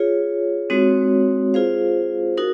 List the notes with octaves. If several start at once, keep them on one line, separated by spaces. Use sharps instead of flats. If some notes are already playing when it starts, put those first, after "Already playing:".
Already playing: F4 G#4 C#5
G#3 C4 D#4 F#4 C#5
F4 G#4 C5 F5
D#4 F#4 A#4